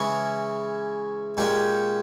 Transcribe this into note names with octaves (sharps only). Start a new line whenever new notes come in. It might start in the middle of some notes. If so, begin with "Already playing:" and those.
Already playing: C#3 E3 G#3 C#4
A#2 G#3 C#4 G4